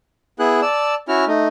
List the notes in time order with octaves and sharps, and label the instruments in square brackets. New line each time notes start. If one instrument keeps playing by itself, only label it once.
[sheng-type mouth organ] B3 E4 G#4 F#6
D5 A5 E6
C#4 E4 F#4 F6
A3 D#4